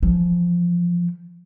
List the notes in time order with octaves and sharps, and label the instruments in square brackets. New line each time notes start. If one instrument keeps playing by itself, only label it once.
[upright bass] E3 F3